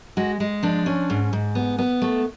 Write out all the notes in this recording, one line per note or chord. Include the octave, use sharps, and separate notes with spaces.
G#3 F#4
G#3
F3 D4
C#4
G#2
G#2
B3
B3
A3